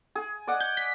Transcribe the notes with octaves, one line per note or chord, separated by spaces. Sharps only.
G#4
D5 D#5 F#5
G6
B6